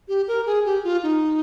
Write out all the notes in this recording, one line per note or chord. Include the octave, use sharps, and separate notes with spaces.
G4
A#4
G#4
G4
F4
D#4